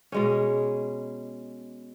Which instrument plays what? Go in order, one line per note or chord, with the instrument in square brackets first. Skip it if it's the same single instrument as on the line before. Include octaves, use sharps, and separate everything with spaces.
[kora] B2 G#3 C#4